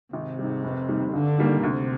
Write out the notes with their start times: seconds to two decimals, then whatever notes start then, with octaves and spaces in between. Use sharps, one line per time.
0.13 G#1 C3
0.39 G#2 G3
0.64 F1
0.89 D#2 D#3 G3
1.13 G2 D3
1.38 D#3 G3 A#3
1.63 D2 C3